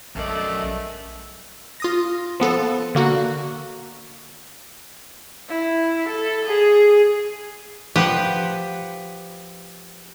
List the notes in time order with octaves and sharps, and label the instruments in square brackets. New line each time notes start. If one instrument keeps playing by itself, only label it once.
[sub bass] A#1 [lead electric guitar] F#2 D5 [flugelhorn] A3 [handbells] C#4 A#4 D#5
[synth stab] F4 D#6 A#6
F3 B3 A4
D3 A#3 F#4
[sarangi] E4
A4
G#4
[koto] F3 G4 B4 F#5